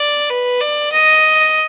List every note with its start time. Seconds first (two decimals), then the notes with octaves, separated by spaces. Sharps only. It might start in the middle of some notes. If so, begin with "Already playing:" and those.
Already playing: D5
0.30 B4
0.60 D5
0.92 D#5